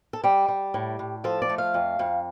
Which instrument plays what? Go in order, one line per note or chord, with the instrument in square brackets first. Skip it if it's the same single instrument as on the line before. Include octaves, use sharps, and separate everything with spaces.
[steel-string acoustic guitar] A4
G3 G4
G3
A2
A2
F3 A4
D5
A3
F5
F2
F2